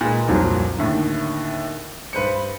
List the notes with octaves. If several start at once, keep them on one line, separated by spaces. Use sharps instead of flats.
A#2 G#3 B4
C2 F2 A#2 F#3
D#2 A2 D3
G2 B4 C5 C#7